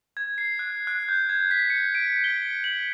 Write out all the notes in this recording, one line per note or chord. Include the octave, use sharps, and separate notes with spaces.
G#6
C7
F#6
F#6
G6
G#6
B6
C#7
D7
G7
F#7